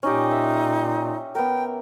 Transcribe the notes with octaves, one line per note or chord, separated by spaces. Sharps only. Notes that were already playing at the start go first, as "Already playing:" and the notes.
A#2 C#4 D#4 G4
E5
B3 A#4 G5